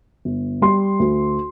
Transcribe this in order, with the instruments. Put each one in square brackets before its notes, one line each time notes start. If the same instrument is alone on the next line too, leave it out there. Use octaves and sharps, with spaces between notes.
[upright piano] G1
G3 C6
D2